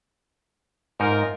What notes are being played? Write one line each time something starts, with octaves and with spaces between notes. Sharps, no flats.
G#2 D#4 F4 A#4